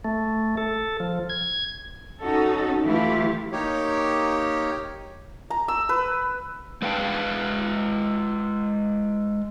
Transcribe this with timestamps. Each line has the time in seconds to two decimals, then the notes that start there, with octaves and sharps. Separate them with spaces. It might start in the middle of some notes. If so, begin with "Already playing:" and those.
0.05 A3
0.57 A4
1.00 F3
1.30 G#6
2.22 C#4 D#4 F#4 A4
2.86 E3 A3 E4 F4 G4
3.52 A#3 D#4 G4 C#5
5.50 A#5
5.68 E6
5.89 B4
6.82 G#3 B4 F5 G5 A5